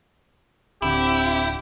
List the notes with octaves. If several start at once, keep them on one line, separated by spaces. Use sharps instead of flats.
D1 D3 C4 E4 G4